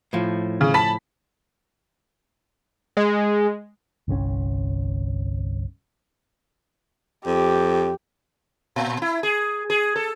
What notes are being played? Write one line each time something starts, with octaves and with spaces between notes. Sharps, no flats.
A2 F3
C#3
A5 B5 B6
G#3
G1 C2 C3 C#4
F2 G4
A#2
E4
G#4
G#4
A4